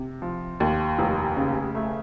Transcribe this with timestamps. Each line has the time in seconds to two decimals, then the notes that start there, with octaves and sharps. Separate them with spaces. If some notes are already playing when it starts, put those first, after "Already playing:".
Already playing: C3
0.22 F3
0.60 D#2
0.99 F1
1.37 C#3
1.75 A3